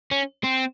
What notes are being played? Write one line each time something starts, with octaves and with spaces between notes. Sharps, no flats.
C#4
C4